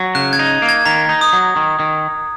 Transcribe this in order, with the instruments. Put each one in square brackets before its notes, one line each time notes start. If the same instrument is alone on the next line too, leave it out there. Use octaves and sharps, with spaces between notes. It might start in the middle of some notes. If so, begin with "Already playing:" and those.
Already playing: [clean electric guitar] F#3
[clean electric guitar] C#3 [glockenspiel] F#6
[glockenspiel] G#6
[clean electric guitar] D#4
A#3
[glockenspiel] G#6
[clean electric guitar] D#3 [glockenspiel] A#5
[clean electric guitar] D#4
[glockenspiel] D#6
[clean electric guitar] F#3
D#3
D#3